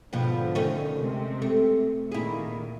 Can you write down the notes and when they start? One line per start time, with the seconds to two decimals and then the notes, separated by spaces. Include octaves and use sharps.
0.13 G#2 B2 D3 F3
0.55 D#3 A3 C#4
0.99 C3 G#3 C4
1.42 A3
2.12 A#2 D#3 E4 G#4